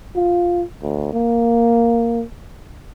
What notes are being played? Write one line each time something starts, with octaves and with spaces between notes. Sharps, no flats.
F4
D2
A#3